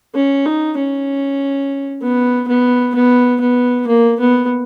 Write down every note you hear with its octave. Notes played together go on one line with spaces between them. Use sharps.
C#4
D#4
C#4
B3
B3
B3
B3
A#3
B3